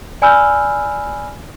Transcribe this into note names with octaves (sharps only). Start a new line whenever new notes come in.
D5 G#5 B5 E6 F6 G6